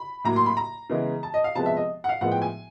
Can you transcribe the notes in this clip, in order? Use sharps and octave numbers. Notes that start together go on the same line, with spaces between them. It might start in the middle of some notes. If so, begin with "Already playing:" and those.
Already playing: B5
A2 F#3 A#3 A#5
C6
B5
A#5
C#3 E3 G#3 B3
A5
D#5
F5
C3 F3 G#3 B3 A5
E5
D#5
F#5
F5
A2 F3 G#3 B3 F#5
G5
G#5